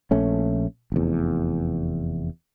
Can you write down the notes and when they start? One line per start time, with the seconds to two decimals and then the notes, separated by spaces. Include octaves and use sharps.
0.11 A#1 A3 C#4
0.92 F1 E2